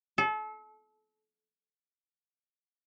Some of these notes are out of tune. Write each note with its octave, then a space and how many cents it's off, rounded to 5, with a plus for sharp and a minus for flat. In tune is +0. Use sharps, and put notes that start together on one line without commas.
A4 -35